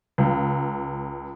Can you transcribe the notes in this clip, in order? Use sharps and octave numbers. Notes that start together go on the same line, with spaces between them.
C#2